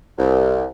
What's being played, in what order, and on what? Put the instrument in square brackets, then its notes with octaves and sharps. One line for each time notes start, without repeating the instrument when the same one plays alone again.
[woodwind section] C2